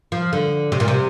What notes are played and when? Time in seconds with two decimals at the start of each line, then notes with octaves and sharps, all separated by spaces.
0.12 F3
0.33 D3
0.72 C3
0.80 A#2
0.88 C3